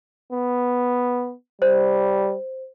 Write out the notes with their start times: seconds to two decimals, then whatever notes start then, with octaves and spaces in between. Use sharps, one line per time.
0.33 B3
1.62 G3 C5